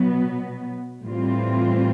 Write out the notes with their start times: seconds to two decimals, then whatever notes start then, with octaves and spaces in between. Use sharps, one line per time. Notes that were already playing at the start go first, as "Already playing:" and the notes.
Already playing: B2 F#3 B3
1.05 A2 E3 G3 C4 F4